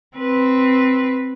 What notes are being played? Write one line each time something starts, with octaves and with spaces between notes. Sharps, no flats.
C4 B4